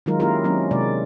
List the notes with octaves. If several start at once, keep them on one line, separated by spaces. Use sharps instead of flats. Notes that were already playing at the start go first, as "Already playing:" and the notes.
D#3 F#3 G#3 D#4 F4 A#4
A#3 C#4 E4 F4 G4 A#4
F#3 A#3 C4 C#4 E4
C3 G#3 D5